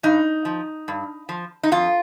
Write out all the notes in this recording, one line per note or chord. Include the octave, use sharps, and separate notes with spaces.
G2 D#4
F3
G2
F3
D#4
F2 F4